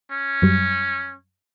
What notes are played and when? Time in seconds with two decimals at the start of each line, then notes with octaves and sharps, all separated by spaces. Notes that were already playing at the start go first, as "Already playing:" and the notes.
0.11 C#4
0.42 F#2 F#3 G3